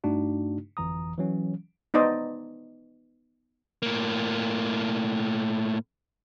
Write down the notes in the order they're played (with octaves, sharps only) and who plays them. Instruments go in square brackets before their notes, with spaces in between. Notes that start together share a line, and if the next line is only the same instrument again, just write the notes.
[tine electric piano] G2 A3 D4 D#4 F#4
G1 F2 E3 A#5 D#6
E3 F#3 C#4
[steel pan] B3 D#4 C5 D5 D#5
[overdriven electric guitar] A2 A#3